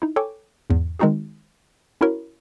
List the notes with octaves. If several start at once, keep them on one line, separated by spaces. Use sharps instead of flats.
D#4 E4
A4 C#5 G5 G#5 C#6 D6
E2 G#2
D#3 G#3 C4 D#4 F#4 G#4
C#4 E4 F#4 A#4 C#5 B5